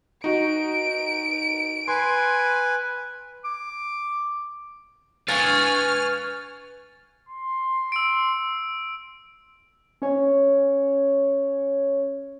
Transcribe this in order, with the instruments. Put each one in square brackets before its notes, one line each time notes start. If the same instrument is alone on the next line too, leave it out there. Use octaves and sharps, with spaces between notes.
[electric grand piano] D#4 F#4 [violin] D7
[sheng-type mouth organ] B4 G#5 [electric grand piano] C6
[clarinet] D6
[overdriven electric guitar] B4 F5 [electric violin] G#5 C#6 [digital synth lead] F6 [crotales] A6
[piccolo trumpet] C6
[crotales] E6 D7
[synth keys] C#4 C#5